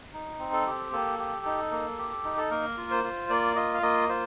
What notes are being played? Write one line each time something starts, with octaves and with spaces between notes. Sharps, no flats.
D#4
C4
A4
G4
A#3 A4
G4
D#4
A#3
G4
D#4
A4
A#3 A#4
F4
C5
F4
A#3 D5
F4 D#5
F5
A#3 D#5
F4 C5